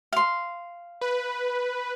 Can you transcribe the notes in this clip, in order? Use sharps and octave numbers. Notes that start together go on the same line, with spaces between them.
F5 C6
B4